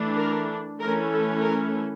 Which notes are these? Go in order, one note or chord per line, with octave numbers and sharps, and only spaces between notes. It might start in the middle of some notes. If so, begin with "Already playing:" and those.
Already playing: E3 A3 D4
A#4
E3 A3 C#4 A#4
A4
A#4